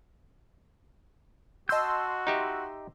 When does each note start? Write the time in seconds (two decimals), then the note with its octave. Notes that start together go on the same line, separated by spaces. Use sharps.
1.69 F#4 D#5 A5 C6 E6 G6
2.27 D#4 G4 E5